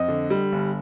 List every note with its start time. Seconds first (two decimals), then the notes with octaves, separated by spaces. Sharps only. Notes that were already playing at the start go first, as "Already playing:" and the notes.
Already playing: F2 D#5
0.08 D3
0.30 G3
0.52 G1